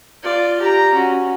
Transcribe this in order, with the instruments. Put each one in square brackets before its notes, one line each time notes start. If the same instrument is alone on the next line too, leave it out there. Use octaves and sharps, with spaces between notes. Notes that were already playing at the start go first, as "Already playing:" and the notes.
[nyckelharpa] F4 D5
G4 A#5
C#4 F#4